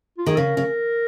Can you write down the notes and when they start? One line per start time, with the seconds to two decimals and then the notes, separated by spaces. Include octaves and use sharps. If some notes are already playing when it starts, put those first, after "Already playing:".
0.18 F4
0.26 D#3 G#4
0.36 C#3 A#4
0.57 C#3